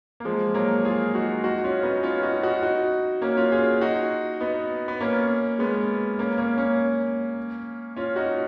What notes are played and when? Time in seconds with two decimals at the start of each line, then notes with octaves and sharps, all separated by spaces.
0.20 A#3
0.25 F3 G#3
0.54 F#3 A#3
0.85 F4 G#4
1.14 D#4 F#4
1.44 D#4 F#4
1.64 C#4 F4
1.83 B3 D#4
2.03 C#4 F4
2.23 D#4 F#4
2.42 D#4 F#4
2.63 D#4 F#4
3.22 A#3 C#4
3.36 C#4 F4
3.52 F4 G#4
3.81 D#4 F#4
4.40 B3 D#4
4.88 B3
5.01 A#3 C#4
5.59 G#3 B3
6.19 A#3 C#4
6.38 A#3 C#4
6.58 A#3 C#4
7.96 C#4 F4
8.16 D#4 F#4